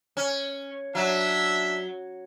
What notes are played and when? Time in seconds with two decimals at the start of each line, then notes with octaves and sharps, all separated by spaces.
0.17 C#4
0.95 F#3 D4 E5